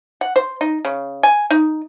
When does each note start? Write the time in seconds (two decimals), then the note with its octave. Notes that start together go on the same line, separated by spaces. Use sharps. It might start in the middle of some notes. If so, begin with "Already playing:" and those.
0.21 F#5
0.36 C5
0.61 D#4
0.85 C#3
1.23 G#5
1.50 D#4